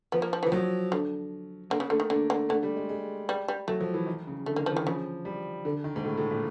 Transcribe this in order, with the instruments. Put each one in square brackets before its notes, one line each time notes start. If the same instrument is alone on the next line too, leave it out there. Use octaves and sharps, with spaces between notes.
[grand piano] F3 [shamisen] B3
[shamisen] A#3
F3
E3
[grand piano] F3
[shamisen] D#3 [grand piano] F#3
[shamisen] D3
[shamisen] D3 [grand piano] A#3
[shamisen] C#3
[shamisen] D3 [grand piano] A3
[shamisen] D#3
[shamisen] D3 [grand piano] A#3
[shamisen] D3
[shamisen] D3 [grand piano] A3
[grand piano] G3
G#3
G#3
[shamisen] G3
G3
[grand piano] F#3 [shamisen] A3
[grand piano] F3
E3
D#3
C#3
[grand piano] D3 [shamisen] A3
[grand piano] D#3 [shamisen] A#3
[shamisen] F3
[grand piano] E3
[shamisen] D#3
[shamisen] C#3 [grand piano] F3
[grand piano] G3
D3
D#3
G#2
A2
A2
A#2